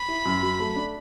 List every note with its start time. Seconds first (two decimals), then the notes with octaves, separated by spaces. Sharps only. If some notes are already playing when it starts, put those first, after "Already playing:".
Already playing: B5
0.08 E4
0.26 F#2
0.43 F#3
0.59 A3
0.76 D4